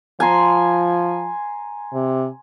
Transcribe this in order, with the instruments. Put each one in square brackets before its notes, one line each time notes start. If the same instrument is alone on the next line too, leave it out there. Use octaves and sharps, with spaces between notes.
[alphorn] F3 [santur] G#5 A#5 C6
[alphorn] C3